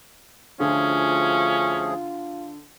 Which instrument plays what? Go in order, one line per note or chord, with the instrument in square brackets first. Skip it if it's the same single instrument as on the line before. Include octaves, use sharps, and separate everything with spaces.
[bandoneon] D2 F3 G#4 [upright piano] D3 [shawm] C#4 [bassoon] F4